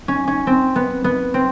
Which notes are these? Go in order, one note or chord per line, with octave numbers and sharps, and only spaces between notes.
C#4
C#4
C4
B3
B3
C4